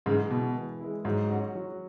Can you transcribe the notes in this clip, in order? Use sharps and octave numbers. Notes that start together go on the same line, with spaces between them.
G#2 C#3 E3
B2 G#3 E4
E3
G#3 E4
G#2 F#3
C#4 F#4
F#3